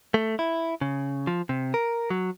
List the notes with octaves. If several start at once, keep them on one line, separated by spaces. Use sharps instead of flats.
A3
E4
C#3
F3
C3
A#4
F#3